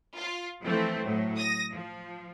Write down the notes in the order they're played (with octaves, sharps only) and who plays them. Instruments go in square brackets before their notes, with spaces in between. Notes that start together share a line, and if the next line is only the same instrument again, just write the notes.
[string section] F4
E3 F3 A3 C4
A2 F#3
D#6 A#6
F3